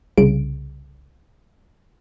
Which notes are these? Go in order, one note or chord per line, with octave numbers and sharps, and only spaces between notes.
C2 C#3 D7